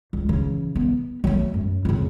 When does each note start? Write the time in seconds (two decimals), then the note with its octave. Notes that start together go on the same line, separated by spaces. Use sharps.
0.13 C#2
0.29 C#3 E3
0.76 B3
1.24 F#3 A3
1.54 F#2
1.85 F2 C#3